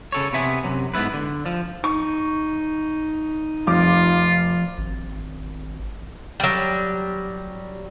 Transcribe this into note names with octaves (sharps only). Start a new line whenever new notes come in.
C#3 A4 C#5
C3 B3 E5 G#5
F#2 C3 F#3
G#2 B3 E4 B4
D3
F3
D#4 C#6
F1 F3 F4 D6
G#1
F#3 G3